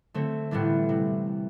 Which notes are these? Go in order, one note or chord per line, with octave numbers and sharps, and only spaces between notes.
D3 A3 C4
A2 E3 G3 B3 D4
C3